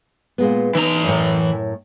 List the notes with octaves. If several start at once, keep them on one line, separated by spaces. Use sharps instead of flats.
A#2 G#3 B3
E3 D#4 A#5
F#2 A2